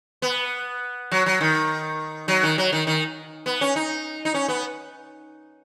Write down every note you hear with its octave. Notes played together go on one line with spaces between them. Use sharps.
B3
F#3
F#3
D#3
F#3
D#3
F#3
D#3
D#3
B3
C#4
D#4
D#4
C#4
B3